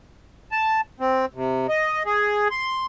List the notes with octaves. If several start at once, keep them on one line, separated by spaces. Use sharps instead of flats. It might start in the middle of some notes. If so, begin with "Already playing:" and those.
A5
C4
C3
D#5
G#4
C6